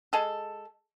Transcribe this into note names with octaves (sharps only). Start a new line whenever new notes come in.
G#3 G#4 A4